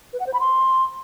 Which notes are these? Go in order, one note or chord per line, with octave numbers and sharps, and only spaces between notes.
B4
F#5
C5
B5
C6